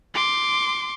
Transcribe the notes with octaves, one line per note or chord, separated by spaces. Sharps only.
C6 D6